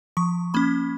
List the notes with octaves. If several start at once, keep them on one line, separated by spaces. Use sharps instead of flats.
F3 C#6
A#3 C#4 B5